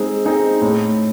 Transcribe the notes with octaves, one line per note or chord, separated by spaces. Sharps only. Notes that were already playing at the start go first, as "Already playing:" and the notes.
Already playing: G#3 C4 D#4 G#4
C4 D#4 G#4
A2